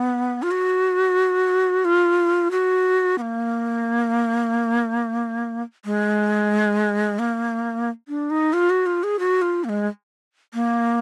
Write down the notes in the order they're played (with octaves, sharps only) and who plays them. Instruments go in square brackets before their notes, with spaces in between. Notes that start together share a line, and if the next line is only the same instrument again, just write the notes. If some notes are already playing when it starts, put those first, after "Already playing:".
Already playing: [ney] B3
F4
F#4
F4
F#4
B3
A#3
G#3
A#3
D4
D#4
F4
F#4
F4
G#4
F#4
F4
A#3
G#3
A#3